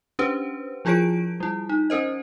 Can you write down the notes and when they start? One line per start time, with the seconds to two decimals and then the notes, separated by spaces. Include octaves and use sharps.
0.19 C#4 D4 G4 B4 C5
0.85 F3 E4 F4 G#4 C#5 D7
1.40 G3 E4
1.69 D#4
1.90 C#4 A#4 C5 D#5